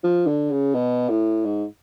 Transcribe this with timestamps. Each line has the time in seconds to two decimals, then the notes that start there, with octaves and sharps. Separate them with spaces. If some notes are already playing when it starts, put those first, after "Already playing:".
0.04 F3
0.27 D3
0.51 C#3
0.75 B2
1.09 A2
1.45 G#2